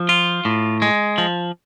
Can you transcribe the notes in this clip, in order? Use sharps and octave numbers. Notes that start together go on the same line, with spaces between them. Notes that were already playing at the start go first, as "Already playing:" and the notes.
Already playing: F3
F4
A2
G#3
F3